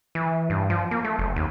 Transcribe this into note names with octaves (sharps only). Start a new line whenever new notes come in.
E3
G2
F3
A#3
A3
F#1
D#2